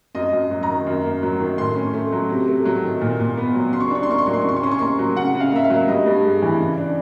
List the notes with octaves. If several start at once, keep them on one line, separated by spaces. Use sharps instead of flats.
F#2 D#5
F#2
F#3
A#5
D#3
F#2
A#3
F#3
D#3
A2 C6
C#4
A3
F#3
C3
A3
F#3
D#3
A#2
A#2
B3
F#3
C#3 C6
C#6
C6
D4 C#6
C6
A#3 C#6
C6
F#3 C#6
C6
C#6
C#3 C6
C#6
C#4 C6
C#6
A#3 C6
F#3
C#3 F#5
C#3
F5
A#3 E5
F5
F#3
E5
G2 D#5
G2
G#3
E3
C#3
D4